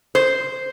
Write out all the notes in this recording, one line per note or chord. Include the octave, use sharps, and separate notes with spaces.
C5